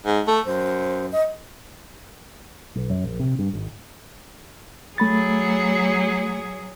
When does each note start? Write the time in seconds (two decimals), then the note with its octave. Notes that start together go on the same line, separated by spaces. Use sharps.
0.06 G#2
0.27 A3 A5
0.45 F#2 C5
1.12 D#5
2.75 B1
2.90 F#2
3.04 A#1
3.20 C3
3.39 G2
3.53 G#1
4.98 F#3 A3 G#4 B5 A6